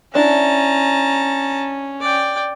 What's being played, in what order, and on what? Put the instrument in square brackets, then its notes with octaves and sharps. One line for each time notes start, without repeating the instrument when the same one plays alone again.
[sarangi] C#4 [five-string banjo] D4 E4 [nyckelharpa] A5 A#5
[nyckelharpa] D5 G5